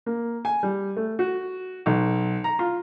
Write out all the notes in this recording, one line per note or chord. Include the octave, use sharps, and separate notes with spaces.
A#3
G#5
G3
A3
F#4
B1
A#5
F4